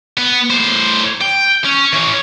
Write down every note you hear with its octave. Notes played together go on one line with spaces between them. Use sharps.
B3
A2 C5
G5
C#4
E3 C#4